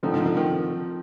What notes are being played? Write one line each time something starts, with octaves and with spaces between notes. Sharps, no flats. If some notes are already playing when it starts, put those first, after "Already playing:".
D3 F3 C4 D#4
D3
D3
D#3